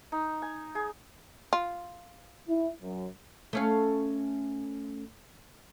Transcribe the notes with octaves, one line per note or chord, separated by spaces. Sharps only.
D#4
G#5
G#4
F4
E4
F#2
A3 C#4 F5